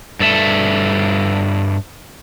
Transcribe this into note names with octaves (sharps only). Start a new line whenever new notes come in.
G2 A4 E5